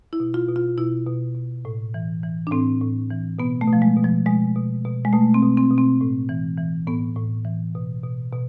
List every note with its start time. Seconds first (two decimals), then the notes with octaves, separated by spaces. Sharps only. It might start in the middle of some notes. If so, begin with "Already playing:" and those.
0.13 E4
0.20 B2
0.34 F4
0.48 B2
0.56 F4
0.78 B2 E4
1.06 B2
1.35 B2
1.65 A2
1.94 E3
2.23 E3
2.47 D4
2.51 A2 C4
2.81 A2
3.10 E3
3.39 B2 B3
3.61 A3
3.68 B2
3.73 F3
3.82 G#3
3.96 B2
4.04 F3
4.26 B2 G#3
4.56 B2
4.85 B2
5.05 G#3
5.13 B2 A3
5.34 C4
5.42 B2
5.57 C4
5.71 B2
5.78 C4
6.01 A2
6.29 E3
6.58 E3
6.87 A2 B3
7.16 A2
7.45 E3
7.75 B2
8.03 B2
8.33 B2